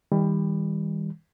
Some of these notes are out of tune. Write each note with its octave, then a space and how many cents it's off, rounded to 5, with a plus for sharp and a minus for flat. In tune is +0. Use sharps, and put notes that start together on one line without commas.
D#3 +45 G3 +25